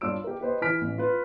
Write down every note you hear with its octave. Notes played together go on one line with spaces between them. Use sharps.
G2 D4 F4 C#5 E6 D7
G4 A#4
G4 B4 C5 D#5
E3 B4 G#5 F6 B6 D7
A1
F4 B4